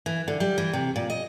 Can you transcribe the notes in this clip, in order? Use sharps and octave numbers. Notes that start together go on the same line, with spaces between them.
E3
D3
G3
E3
C3
A#2
D#5